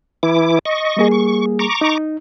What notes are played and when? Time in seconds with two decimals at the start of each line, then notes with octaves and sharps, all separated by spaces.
0.23 E3 E4 D6
0.65 D#5 C#6
0.97 G3 A#3 G#4
1.11 C#6
1.59 A#5 C#6 D6
1.81 D#4